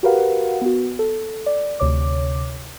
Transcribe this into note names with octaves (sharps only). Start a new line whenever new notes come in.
F#4 G4 A#4 B4 F5 F#5
B3 F#4
A4
D5
D2 C3 C#5 D6